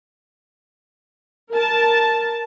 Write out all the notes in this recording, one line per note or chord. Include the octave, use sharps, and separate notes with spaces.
A#4 A5